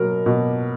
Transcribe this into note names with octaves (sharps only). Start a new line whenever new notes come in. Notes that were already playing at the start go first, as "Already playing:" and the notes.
Already playing: B2 F#3 A#4
B2